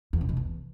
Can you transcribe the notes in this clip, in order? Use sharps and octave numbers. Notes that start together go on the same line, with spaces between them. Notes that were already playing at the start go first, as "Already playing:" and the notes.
E2
C#3
B2
E2